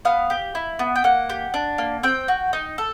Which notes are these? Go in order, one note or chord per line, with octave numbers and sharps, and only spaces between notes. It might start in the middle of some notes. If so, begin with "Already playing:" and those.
B3 F5
G4
E4
B3
G5
A#3 F#5
G4
D4
A#3
C4 G5
F#4
D#4
A4